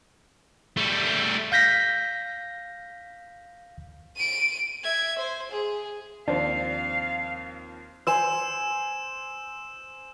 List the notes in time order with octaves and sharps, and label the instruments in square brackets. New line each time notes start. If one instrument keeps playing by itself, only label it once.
[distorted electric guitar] G3 A3
[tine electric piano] F5 G6 A#6 B6
[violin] D7 D#7
E5 G#6
C5
G#4
[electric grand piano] D#2 F3 C4 [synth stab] D4 C5 [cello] F5
[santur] C5 G#5 C6 [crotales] E6 E7